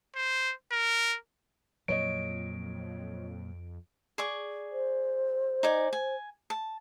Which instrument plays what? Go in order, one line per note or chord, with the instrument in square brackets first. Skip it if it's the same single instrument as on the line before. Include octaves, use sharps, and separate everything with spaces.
[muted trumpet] C5
A#4
[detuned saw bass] F2 [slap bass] A#2 F#3 [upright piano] C#5 D#5 [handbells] D7
[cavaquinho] G#4 D5 C#6
[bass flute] C5
[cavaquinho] D#4 D5 G#5
G#5
A5